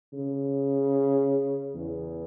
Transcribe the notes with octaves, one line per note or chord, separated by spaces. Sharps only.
C#3
E2